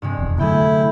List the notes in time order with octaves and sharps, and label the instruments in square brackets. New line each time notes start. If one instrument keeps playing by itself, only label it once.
[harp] G2 C3 G#3
[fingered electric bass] F1 E2
[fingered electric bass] D3 F#3 A3 [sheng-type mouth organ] E4 [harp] G#4 A4 G5